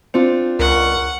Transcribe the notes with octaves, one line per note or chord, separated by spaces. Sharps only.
C4 D4 F4 C5
C#2 A#4 F#5 C#6